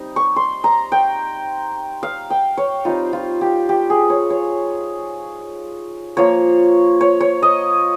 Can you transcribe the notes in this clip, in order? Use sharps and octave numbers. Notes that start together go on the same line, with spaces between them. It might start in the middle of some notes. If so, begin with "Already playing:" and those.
Already playing: G3 C4 D#4
C#6
C6
A#5
G5
F5
G5
C#5
G3 C4 D#4 F4
F4
G4
G4
G#4
C#5
C#5
F3 A#3 F4 C#5
C#5
C#5
D#5